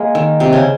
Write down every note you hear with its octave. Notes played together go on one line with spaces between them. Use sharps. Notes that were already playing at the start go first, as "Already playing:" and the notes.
Already playing: G#3 A#3
D#3
C3
C#3